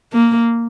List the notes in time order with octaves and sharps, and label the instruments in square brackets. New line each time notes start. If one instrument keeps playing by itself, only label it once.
[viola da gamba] A#3